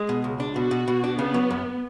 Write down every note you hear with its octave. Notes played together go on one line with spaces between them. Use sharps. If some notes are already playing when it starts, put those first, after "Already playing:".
Already playing: G#3 G#4
B2
C#2
D4
B2 F#4
B2
B2
D4
C#3 B3
F#3
F#2